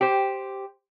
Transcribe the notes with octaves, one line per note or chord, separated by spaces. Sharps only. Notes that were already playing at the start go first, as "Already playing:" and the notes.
G4 C5